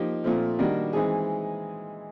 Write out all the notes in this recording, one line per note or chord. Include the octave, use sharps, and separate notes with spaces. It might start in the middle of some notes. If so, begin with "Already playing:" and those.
Already playing: F3 A#3 D#4 G4
A#2 F3 A3 C4
D#3 G3 A#3 D4 F#4
E3 G#3 C4 D#4 G#4